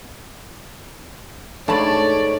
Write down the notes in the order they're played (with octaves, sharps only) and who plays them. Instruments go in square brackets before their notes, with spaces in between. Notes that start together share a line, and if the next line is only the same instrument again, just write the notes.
[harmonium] G#2 C#5 [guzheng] A3 B5 [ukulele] D4 A5 [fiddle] D5